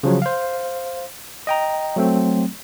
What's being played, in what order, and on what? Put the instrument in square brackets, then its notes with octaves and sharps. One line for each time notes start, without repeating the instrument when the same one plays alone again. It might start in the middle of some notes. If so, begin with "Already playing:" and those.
[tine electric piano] C#3 F3 F#3
C5 F5
D#5 G5 A#5
F#3 A3 C4